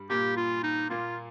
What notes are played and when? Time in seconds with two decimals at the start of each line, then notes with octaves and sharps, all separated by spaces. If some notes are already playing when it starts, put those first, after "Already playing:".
Already playing: G2 G3
0.10 A#2 A#3 G4
0.37 F4
0.63 D#4
0.90 A#2 A#3 F4